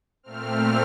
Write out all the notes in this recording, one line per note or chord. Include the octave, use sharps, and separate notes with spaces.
A#2 A3 C4 F6